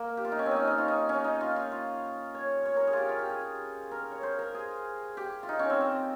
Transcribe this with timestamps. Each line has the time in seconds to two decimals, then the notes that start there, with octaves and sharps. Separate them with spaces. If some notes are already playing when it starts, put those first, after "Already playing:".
Already playing: A#3 A#4
0.17 G4
0.25 F4
0.32 D#4
0.39 C#4
0.46 C4
0.51 C#4 D#4
0.67 D#4
0.78 F4
0.88 D#4
1.09 C#4
1.24 D#4
1.41 F4
1.56 F4
1.72 F4
2.35 C#5
2.66 C#5
2.76 A#4
2.87 G#4
2.93 F4 G4
3.09 F4
3.19 G4
3.29 G#4
3.91 A#4
4.12 C#5
4.23 C5
4.39 A#4
4.55 G#4
5.17 G4
5.43 F4
5.49 D#4
5.59 C#4
5.70 C4
5.81 C4